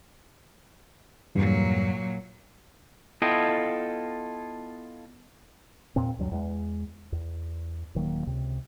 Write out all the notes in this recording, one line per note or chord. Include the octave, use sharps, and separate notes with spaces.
E2 G2 A#2 F#3
B3 E4 F4 A4 D#5 G5
E2 A#2 C4
D2 G2 F#3
E2 G#3
E2
D#1 D#3 F#3 A#3
C#2 C3